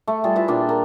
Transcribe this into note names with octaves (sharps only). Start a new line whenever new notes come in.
A3
G3 F4 G#4 A4
E4 F4 B4 E5
A#2 D4 F4 G5
A#4